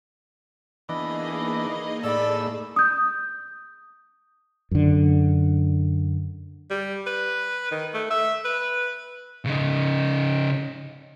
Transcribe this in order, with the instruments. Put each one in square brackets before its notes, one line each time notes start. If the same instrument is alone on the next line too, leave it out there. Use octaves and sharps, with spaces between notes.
[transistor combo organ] E3 B3 D4 [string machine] A#3 D#4 G#4 [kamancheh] D#5
[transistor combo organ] A2 E6 [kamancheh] A4 B5 [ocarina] D5
[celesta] D#6 G6
[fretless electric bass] F#2 D3
[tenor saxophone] G3
B4
D#3
A3
E5
B4
[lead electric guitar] C#3 D#4